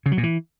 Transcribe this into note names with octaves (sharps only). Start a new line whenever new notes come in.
C#3
F#3
A#2
E3